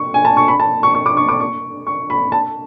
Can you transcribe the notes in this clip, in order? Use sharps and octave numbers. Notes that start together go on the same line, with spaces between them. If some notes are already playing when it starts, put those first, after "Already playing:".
Already playing: C#6
G#5
A5
C#6
B5
A5
C#6
C#6
D6
C#6
D6
C#6
C#6
B5
A5